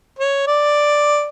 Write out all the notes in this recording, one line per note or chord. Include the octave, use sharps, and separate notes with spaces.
C#5
D5